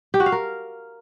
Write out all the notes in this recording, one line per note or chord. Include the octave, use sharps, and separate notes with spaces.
G4
F#4
F5
A#4